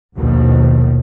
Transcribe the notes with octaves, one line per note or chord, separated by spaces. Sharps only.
A#1 D#2 B2 D#3 F3